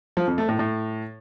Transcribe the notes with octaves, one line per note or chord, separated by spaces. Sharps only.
F3
F2
A3
A2
A2